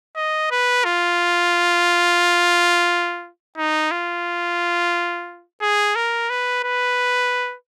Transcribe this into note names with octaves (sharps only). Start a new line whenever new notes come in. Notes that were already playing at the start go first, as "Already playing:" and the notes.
D#5
B4
F4
D#4
F4
G#4
A#4
B4
B4